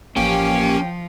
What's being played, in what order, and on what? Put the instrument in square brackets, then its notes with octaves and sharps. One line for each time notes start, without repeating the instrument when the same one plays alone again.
[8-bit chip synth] A1 A#3 G4 [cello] F3 [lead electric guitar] C#4 [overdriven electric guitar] G5